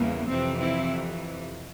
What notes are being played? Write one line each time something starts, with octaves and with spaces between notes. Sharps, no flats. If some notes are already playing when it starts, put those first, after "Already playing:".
Already playing: E2 C#3 E3 G3 A#3
F2 C3 E3 C4
C4 E4